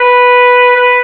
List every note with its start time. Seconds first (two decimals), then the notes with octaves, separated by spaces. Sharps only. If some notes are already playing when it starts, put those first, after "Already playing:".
Already playing: B4
0.76 B4